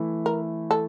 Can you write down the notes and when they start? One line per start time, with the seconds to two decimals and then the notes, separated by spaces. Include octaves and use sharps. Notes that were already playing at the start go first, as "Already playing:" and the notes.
Already playing: E3 A3 E4
0.26 A#4
0.71 A4